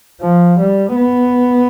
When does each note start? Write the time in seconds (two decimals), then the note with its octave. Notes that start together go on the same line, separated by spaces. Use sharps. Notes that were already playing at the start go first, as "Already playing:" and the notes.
0.22 F3
0.60 G3
0.96 B3